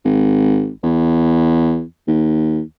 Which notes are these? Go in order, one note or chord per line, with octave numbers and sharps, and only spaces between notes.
G#1
E2
D#2